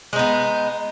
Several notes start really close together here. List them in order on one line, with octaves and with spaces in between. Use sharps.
G#3 D#4 B3